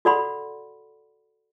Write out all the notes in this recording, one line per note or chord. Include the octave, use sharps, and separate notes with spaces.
F#4 A4 D5 F#5 B5 C6